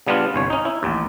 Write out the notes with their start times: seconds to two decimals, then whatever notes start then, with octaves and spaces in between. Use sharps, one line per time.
0.07 C#3 G3 B3 D4 F4
0.34 G1 C2 C#5
0.50 C#4 D#4
0.65 E4
0.83 A1 D#2